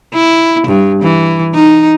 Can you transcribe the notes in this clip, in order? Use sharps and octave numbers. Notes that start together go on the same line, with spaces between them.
E4
G2
E3
D#4